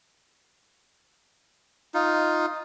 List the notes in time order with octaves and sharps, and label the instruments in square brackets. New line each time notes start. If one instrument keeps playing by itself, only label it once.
[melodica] D#4 F4